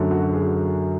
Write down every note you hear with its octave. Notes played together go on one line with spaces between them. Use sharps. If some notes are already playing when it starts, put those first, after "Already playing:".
Already playing: F#2 D3 F#3 A3
F#4
G#4